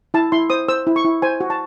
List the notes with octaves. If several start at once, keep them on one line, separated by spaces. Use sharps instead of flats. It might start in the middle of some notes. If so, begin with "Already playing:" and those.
E4 A5
E4 C6
C5 D#6
C5 E6
E4
C#6
E4
C5 G#5
F#4
A5